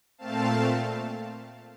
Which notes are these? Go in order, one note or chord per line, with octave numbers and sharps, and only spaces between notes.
A#2 A3 C4 F5 A5